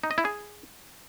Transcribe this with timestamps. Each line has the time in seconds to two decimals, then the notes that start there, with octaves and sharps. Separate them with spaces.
0.04 D#4
0.11 D#5
0.18 E4
0.25 G#4